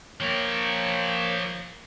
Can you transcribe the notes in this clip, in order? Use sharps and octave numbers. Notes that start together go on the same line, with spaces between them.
F3 A#3 A#4 C#5 G5